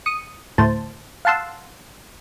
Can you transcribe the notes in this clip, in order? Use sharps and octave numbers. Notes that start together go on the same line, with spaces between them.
D#6 C#7
D2 A2 C5 A5
F5 F#5 A5 C6 E6